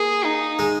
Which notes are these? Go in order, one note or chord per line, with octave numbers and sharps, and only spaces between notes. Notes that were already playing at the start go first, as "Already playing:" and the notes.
Already playing: A#3 G#4
D#4
G#3